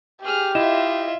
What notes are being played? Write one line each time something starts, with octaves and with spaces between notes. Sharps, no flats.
G4 G#4 F6
E4 F4 D#5 E5 E7